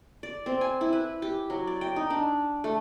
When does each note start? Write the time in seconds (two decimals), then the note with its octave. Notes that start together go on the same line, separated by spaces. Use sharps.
0.23 D5
0.46 C4
0.61 G#5
0.81 E4
0.93 B4
1.22 G4
1.50 F#3
1.67 D5
1.81 G5
1.96 D#4
2.10 D4
2.64 A3